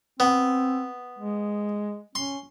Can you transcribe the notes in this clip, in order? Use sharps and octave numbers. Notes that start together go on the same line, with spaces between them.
B3 C4
G#3
C#4 C6